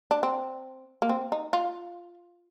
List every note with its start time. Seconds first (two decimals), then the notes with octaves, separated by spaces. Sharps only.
0.11 D4
0.23 C4
1.02 A#3
1.09 C4
1.32 D#4
1.53 F4